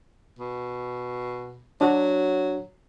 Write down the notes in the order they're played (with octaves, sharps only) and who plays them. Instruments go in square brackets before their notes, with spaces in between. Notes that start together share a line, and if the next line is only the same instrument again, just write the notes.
[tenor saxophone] B2
[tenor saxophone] F#3 [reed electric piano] D4 F#4